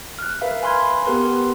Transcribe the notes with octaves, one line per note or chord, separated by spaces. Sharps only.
F6 F#6
A#4 B4 E5 F5
G#5 B5 C6 F6 G#6
B3 G4 A#4 B4 C6